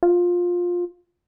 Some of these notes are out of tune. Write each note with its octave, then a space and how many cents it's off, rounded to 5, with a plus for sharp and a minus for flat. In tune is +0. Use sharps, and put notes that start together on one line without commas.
F4 +15